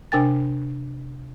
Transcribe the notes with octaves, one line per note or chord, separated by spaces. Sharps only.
C3 D4 A#4 G5 G#5 A6